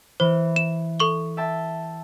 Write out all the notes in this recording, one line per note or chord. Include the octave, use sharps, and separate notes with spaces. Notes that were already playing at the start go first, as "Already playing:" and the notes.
E3 C5
E7
A4 C#6 G7
E5 G5 A5